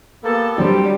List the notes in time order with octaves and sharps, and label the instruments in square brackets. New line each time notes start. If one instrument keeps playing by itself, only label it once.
[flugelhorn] A#3 [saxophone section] B3 G4 A4
[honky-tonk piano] D3 F#3 C4 [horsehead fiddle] G3 [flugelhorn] C5